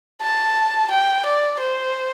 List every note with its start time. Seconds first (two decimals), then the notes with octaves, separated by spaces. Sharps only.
0.21 A5
0.90 G5
1.25 D5
1.60 C5